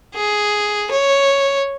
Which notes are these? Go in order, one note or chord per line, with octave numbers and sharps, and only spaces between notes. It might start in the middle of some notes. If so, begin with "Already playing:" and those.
G#4
C#5